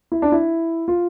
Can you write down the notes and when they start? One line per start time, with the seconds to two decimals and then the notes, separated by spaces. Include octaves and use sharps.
0.12 E4
0.22 D4
0.32 E4
0.88 F4